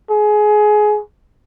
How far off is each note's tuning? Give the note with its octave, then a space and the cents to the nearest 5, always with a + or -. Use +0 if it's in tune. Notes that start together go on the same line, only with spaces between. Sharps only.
G#4 +20